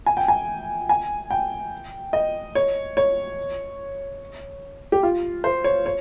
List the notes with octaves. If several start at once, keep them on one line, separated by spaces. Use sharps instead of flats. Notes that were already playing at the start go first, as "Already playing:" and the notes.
G#5
G5
G#5
G#5
G5
D#5
C#5
C#5
G4
F4
C5
C#5
C#5